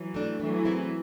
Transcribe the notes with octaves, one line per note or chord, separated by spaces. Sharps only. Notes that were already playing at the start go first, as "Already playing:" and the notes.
Already playing: E3 F#3
A3 D4
E3 F#3 A3
C4 E4 G#4